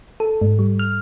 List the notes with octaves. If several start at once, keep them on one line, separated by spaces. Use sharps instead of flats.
A4
G#2
G3
F6